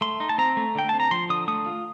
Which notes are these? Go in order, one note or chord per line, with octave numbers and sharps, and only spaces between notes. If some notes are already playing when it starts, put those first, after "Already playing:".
A3 C6
D#4
A5
C4 A#5
A3
D3 G5
C4 A5
A#5
F3 C6
D3 D#6
A3 D#6
F4